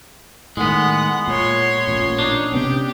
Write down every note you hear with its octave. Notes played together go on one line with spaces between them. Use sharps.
A2 D#3 G#3 B3 F#5
A#2 C#5 C6
A1 A#2
D4 D#4
C3 B3 C#4 G4